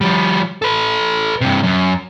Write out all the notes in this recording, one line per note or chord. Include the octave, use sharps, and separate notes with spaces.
F3 G3
A4 B4
G2 C3
F#2